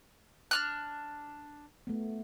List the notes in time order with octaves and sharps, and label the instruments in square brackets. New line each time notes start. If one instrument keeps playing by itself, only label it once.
[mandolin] D4 F6 F#6
[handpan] A3 B3